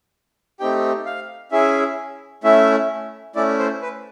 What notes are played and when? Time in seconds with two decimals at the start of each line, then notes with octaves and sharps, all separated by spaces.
0.60 A3 C4 D#4 G4 G5
1.06 F5
1.52 C#4 E4 G#4 E5
2.44 A3 C#4 E4 E5
3.36 A3 C#4 E4 D5
3.59 C5
3.82 B4